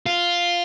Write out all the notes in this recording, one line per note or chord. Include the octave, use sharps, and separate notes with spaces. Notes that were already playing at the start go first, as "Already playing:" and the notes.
F4